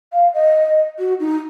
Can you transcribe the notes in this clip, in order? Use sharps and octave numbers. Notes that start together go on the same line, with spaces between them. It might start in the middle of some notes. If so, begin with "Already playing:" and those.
F5
D#5
F#4
D#4